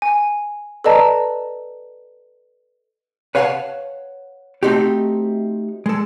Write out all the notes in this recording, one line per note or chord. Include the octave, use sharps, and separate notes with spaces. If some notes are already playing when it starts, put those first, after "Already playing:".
G#5
A4 B4 D5 D#5 A5 A#5
B4 C#5 F5 F#5 G#5 A5
A3 C4 D#4 F#4 G4
G#3 A4